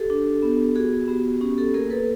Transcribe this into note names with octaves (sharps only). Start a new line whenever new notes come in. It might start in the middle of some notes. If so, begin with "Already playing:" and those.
Already playing: G4 A4
D4
B3
F#4 G#4
B3 G4
C#4 G4
G4 A4
A#3 G#4 A#4
A4 B4